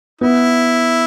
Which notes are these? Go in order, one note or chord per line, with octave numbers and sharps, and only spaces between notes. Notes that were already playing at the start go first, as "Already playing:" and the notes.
B3 E4